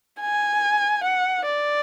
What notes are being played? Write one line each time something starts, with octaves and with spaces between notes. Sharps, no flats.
G#5
F#5
D5